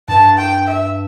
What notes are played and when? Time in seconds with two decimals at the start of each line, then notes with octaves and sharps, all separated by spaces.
0.08 G2 A5
0.38 G5
0.67 E5